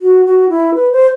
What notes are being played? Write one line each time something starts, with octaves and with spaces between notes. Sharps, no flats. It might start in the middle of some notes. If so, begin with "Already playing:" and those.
F#4
F#4
E4
B4
C5